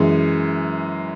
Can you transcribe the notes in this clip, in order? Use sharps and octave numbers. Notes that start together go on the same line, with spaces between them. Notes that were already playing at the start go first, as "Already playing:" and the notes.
Already playing: F#2 E3 G#3